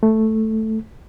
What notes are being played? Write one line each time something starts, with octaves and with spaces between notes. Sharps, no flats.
A3